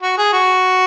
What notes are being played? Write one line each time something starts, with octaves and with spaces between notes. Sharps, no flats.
F#4
G#4
F#4